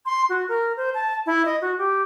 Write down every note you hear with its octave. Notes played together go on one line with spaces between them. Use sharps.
C6
F#4
A#4
C5
A5
E4
D#5
F#4
G4